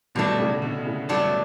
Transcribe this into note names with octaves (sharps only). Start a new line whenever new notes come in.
G2 B2 F#3 A3 D4
A2 C#3
B2 D3
A2 C#3
G2 F#3 A3 D4